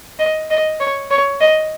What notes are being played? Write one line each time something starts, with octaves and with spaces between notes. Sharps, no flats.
D#5
D#5
C#5
C#5
D#5